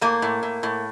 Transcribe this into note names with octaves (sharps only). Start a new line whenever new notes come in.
A2 A#3
A2
A2
A2